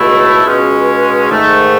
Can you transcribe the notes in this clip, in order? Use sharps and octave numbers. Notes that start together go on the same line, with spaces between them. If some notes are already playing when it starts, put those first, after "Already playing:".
Already playing: C#2 B2 A3 E4
C#2 B2 G#3 C#4
G#2 D#3 A3